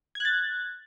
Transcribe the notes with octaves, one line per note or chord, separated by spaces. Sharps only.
F#6 G#6 A6